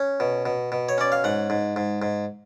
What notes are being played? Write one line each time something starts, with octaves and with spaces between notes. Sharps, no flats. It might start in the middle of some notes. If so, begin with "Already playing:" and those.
Already playing: C#4
B2
B2
B2
C#5
C#4 D5
F5
G#2 F#5
G#2
G#2
G#2